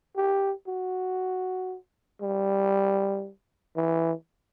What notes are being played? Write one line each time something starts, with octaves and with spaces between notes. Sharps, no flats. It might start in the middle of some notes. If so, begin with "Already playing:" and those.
G4
F#4
G3
E3